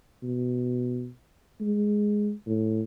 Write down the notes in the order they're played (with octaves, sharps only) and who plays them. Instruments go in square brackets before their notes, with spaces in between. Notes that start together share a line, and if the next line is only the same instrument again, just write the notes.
[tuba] B2
G#3
A2